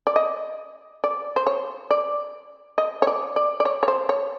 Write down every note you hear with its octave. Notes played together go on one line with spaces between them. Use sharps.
D5
D#5
D5
C5
C#5
D5
D#5
C#5
D5
D5
D5
C#5
C#5
C5
C#5